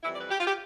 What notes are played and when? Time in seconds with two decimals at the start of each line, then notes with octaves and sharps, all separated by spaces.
0.03 F2 E3 G3 E4
0.13 D5
0.21 B4
0.31 G4
0.40 F4
0.47 G4